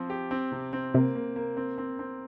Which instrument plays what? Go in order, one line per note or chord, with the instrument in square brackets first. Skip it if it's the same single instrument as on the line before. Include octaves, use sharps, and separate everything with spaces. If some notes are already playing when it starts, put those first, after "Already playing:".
Already playing: [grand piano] F3 C4
G4
C4
C3
C4
[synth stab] C3 [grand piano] A#3
[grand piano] A#3
A#3
C4
C4
C4